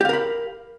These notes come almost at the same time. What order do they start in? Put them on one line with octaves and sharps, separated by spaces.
G4 F5 A#4 B5